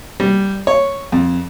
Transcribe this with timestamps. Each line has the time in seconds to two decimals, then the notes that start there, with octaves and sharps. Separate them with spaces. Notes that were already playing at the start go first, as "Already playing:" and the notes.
0.20 G3
0.67 C#5
1.12 F2